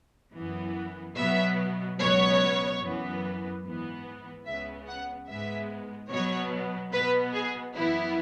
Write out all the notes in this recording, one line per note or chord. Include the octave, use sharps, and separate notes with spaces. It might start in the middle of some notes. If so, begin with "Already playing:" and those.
F#2 E3 B3
B2 F#3 B3 E5
C#2 B2 F#3 B3 C#5
F#2 E3 B3
G#2 E3 B3
C#2 C#3 G#3 B3 E5
F#5
G#2 G#3 B3 E5
B2 F#3 B3 C#5
B2 B3 B4
G#4
F#2 E3 B3 E4